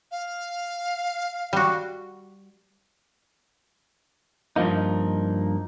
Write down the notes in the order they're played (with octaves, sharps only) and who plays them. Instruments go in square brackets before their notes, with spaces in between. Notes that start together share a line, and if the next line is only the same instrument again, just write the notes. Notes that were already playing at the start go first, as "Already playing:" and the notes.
[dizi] F5
[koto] G3 F#4
[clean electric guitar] G2 F3 F#3 A#3 D#4